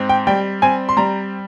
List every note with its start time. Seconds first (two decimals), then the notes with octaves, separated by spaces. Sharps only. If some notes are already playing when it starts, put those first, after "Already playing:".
Already playing: G#2 C4
0.09 G5
0.27 G3 G5
0.62 C4 G#5
0.89 C6
0.97 G3 A#5